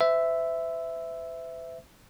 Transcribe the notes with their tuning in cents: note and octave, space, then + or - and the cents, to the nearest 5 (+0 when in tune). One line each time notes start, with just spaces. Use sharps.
C5 -45 E5 +0